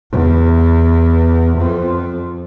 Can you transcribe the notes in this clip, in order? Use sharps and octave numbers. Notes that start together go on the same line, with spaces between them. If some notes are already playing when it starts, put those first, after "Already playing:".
E2
F2